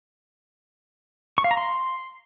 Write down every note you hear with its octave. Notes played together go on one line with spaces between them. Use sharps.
C#6
F5
A#5
C6